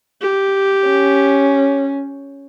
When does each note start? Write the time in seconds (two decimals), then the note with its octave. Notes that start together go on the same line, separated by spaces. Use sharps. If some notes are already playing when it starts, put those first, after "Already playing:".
0.21 G4
0.88 C#4